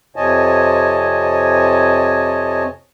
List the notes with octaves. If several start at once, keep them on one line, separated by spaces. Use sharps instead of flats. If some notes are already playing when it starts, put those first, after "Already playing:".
F2 C3 C#5 D#5 G#5 A5